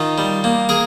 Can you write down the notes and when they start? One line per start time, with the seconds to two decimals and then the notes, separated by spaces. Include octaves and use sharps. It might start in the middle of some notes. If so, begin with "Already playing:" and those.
Already playing: D#3 D#4 F4
0.18 G3
0.44 A#3
0.69 G#4 A#4